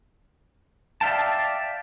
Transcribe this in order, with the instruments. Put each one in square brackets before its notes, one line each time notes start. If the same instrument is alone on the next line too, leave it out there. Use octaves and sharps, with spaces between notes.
[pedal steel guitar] D5 E5 F5 G5 A5